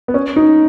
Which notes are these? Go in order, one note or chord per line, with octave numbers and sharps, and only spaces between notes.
B3
C#4
D#4